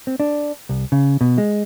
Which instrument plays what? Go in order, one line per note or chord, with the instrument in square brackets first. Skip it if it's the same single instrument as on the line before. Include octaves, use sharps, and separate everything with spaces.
[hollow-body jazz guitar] C4
D4
C2
C#3
B2
G#3